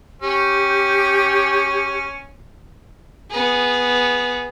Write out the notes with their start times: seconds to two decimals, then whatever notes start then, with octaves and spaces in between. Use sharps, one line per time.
0.22 C#4 G4
3.30 B3 G#4